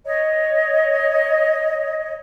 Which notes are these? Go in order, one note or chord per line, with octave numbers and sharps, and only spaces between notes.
C#5 D#5